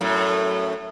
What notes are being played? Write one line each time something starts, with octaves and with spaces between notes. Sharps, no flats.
F#2 A2